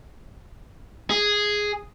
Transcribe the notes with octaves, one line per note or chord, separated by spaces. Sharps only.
G#4